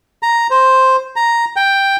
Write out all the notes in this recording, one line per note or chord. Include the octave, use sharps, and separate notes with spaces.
A#5
C5
A#5
G5